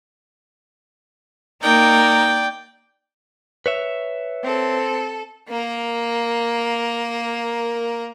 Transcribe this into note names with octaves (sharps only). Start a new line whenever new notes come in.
A#3 D#4 A#4 D5 G5
B4 C#5 E5
C4 A4
A#3 A#4